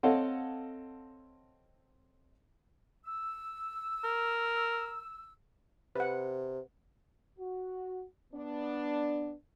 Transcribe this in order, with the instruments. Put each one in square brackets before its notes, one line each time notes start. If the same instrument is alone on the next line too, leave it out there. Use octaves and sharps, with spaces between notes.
[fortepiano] C4 A4 C#5 D#5 F5 F#5
[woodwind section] E6
[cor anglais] A#4
[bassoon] C3 [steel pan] B4 F#5
[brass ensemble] F#4
B3 D4